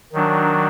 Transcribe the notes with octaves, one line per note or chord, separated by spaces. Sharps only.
D#3 F#3 D4